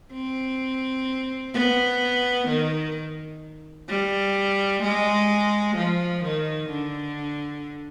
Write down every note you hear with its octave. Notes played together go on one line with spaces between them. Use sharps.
C4
B3
D#3
G3
G#3
F3
D#3
D3